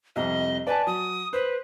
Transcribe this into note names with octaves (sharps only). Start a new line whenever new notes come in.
C2 F2 D#5
B4 D5 G#5 A5
F#3 D#6
B4 C5